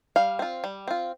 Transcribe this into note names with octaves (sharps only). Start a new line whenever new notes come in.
G3 F5
C4 F4
G3
C4 F4